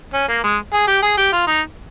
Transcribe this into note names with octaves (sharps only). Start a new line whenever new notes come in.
C#4
A#3
G#3
G#4
G4
G#4
G4
F4
D#4